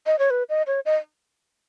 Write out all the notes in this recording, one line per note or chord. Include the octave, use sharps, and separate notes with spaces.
D#5
C#5
B4
D#5
C#5
D#5